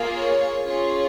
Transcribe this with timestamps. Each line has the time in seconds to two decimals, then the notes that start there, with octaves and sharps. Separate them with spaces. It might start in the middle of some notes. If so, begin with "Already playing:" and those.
Already playing: A#3 F4 G#4
0.17 C#5
0.66 C#4 F4 G#4 C#5